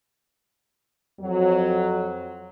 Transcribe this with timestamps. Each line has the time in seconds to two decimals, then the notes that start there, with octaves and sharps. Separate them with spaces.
1.21 F2 F#3